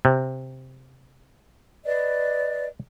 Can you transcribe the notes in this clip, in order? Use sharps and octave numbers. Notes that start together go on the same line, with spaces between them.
C3
B4 D5 D#5